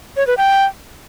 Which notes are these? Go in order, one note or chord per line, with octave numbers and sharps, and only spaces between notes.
C#5
B4
G5